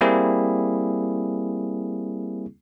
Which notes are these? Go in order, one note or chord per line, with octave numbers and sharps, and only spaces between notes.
G3 A#3 C4 E4 G#4